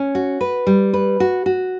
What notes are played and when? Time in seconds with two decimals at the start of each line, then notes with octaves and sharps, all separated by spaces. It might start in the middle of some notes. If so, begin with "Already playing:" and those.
Already playing: C#4
0.15 F#4
0.41 B4
0.67 G3
0.93 B4
1.20 F#4
1.46 F#4